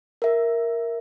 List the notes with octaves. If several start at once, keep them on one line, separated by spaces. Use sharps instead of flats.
A#4 E5